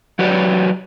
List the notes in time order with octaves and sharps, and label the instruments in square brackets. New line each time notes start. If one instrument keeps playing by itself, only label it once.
[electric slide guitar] F#3 F#4 G4 B4 C#5 D5